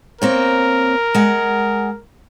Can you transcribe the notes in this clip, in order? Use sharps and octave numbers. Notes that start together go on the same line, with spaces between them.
A#3 C4 A#4 C#5
G#3 F#5